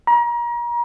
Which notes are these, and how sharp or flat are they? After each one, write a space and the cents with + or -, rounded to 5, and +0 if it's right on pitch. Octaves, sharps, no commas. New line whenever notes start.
A#5 +35